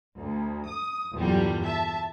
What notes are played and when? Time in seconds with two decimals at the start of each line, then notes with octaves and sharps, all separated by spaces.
0.16 D2
0.68 D#6
1.15 E2 G2 A#2 D3 F#3 G3
1.64 E5 A5